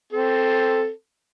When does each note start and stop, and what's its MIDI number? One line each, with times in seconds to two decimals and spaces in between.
0.13 0.90 60
0.13 0.90 69